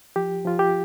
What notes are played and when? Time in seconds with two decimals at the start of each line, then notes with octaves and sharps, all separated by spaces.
0.16 F3 G4
0.45 F3 F4
0.59 G4